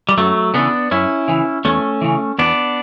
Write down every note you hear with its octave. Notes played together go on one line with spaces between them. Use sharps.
G3
F#2 F#3 A3
C#3 E3 B3 D4
F#2 C#4 E4
C#3 E3
E2 A3 C#4
C#3 E3
E2 B3 D4